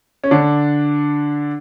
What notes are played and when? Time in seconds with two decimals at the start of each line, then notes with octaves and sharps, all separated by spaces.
0.24 C#4
0.31 D3 D4